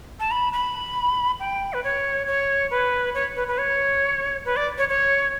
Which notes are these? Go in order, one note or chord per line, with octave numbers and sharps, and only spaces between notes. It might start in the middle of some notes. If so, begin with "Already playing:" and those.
A5
B5
B5
G5
B4
C#5
C#5
B4
C#5
B4
B4
C#5
B4
D5
C#5
C#5